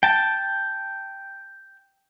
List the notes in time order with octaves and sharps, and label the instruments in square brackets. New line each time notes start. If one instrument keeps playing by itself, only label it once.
[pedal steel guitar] G5 A5